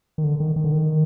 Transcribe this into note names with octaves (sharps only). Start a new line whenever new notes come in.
D#3
D3
D#3
D#3
D3
D#3